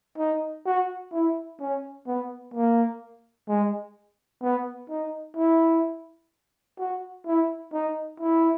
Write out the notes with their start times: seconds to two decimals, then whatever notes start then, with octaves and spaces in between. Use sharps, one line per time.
0.18 D#4
0.66 F#4
1.13 E4
1.60 C#4
2.07 B3
2.54 A#3
3.49 G#3
4.42 B3
4.90 D#4
5.37 E4
6.79 F#4
7.26 E4
7.73 D#4
8.20 E4